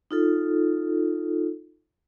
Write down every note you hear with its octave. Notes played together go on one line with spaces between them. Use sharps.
D#4 F4 A4